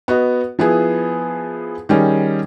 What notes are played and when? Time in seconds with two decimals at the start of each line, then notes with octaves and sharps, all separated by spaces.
0.08 B3 F#4 D#5
0.59 F3 B3 E4 G#4
1.89 D#3 G3 C#4 G#4